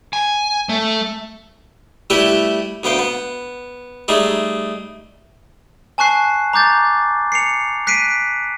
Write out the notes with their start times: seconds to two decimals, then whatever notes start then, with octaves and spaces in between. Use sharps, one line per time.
0.13 G#5
0.69 A3
2.10 G3 A3 E4 G4 B4
2.83 D2 B3 F5 G5
2.99 B3
4.08 G3 A3 D#4 G#4
5.98 G#5 A5 C#6 F#6 C7
6.53 A#5 D6 G6 A6
7.32 C7 C#7 F7
7.87 F#6 B6 C7 D7 D#7